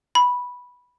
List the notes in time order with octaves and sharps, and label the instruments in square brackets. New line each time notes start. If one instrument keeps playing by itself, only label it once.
[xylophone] B5